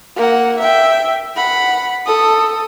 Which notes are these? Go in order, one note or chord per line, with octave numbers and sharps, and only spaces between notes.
A#3 F#5
E5 G5
F#5 B5
A4 D#6